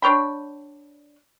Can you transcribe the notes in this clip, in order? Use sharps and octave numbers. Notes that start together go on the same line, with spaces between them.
D4 C#5 G5 B5